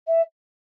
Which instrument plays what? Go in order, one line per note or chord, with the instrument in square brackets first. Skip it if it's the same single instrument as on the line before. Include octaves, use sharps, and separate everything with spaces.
[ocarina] E5